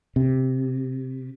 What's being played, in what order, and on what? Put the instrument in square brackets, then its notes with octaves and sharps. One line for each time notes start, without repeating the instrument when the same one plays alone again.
[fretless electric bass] C3